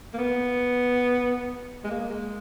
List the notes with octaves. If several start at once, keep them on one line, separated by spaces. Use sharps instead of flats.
A#3
B3
G#3
A#3
G#3